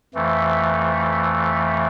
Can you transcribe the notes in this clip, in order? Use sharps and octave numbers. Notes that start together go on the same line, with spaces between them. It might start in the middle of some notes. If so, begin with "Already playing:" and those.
F2 E3 A3